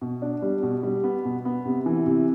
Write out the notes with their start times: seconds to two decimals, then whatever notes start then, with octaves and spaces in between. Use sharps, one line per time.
0.01 B2
0.22 D4
0.42 G3
0.63 B2
0.83 G3
1.04 B3
1.25 B2
1.45 B3
1.65 C3
1.86 E3
2.06 C3